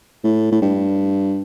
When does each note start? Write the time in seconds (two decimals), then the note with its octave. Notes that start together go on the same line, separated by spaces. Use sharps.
0.24 A2
0.52 A2
0.62 G2